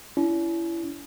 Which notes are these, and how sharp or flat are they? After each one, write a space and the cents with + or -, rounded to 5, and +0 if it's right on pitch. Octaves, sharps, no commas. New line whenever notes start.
C#4 +45 E4 +20